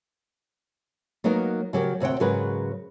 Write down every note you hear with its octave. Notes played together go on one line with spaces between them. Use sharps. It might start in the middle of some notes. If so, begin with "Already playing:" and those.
F#3 A#3 B3 D#4 A#4
C#3 F#3 G4 A#4
D2 C3 C#5 F#5 G5
G#2 C#3 F#3 G#4 A#4 B4